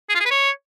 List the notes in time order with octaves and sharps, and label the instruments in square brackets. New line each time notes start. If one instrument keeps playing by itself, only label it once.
[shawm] G#4
F4
G#4
B4
C#5